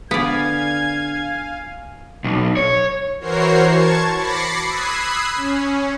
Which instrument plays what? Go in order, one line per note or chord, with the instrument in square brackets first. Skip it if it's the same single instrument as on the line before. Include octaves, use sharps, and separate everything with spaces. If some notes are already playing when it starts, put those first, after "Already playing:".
[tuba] D3 [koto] B3 D5 [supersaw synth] F5 G#5 [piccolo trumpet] G#6
[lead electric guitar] B1
C#5
[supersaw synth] E3 F#4 A#4 C5 C#5 C7
A5 C#6 G#6
B5 D6 A6 A#6 C7 C#7
B5 D#6 E6 F#6 G#6 C7
C#4